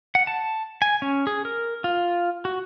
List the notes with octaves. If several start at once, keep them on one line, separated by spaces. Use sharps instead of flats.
F#5
A5
G#5
C#4
G#4
A#4
F4
F#4